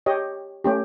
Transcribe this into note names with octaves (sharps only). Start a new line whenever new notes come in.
G4 C#5 D#5
A3 C#4 G4